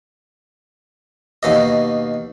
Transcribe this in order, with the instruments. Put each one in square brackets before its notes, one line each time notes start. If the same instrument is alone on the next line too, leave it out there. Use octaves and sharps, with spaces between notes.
[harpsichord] D#2 B2 D#5